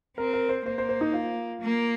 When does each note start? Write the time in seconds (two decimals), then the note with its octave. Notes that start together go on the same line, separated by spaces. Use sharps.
0.18 C4 A#4
0.33 A#4
0.49 C5
0.66 A#3 C5
0.78 C5
0.89 C5
1.01 D#4
1.13 F4
1.61 A#3